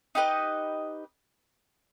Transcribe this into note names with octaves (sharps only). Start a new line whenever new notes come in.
D#4 G4 B4 D#5